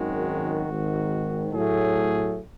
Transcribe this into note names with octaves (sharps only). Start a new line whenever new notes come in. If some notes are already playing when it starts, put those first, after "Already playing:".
Already playing: G#1 F#2 D#3 G#3 F#4
G#1 G#2 D#3
A2 F#3 A3 G#4